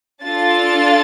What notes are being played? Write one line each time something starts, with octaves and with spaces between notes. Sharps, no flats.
D4 F4 A4 A6